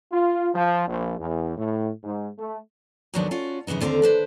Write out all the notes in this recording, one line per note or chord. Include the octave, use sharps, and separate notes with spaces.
F4
F3
A#1
E2
A2
G#2
A3
D#2 G#2 D#3 F#3 B3 D4
C#4 F4 F#4
F#2 C#3 E3 B3 D#4
D#2 D3 C4 G#4 F5 A#5
D4 B4 C5